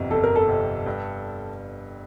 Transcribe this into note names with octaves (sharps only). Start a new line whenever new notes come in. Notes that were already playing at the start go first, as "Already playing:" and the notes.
Already playing: G1 F2 C3
G1 A4
A#4
A4
F2 C3
G2